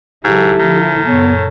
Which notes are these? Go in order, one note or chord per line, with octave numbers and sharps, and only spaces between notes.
C#2 G#2 D#3 F#3 E4 G4 A4
D3 D#3 F3 A3
F#2 A#2 C#3 B3 A4 C#5